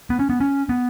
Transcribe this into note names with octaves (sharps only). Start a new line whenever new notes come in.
B3
C#4
B3
C#4
B3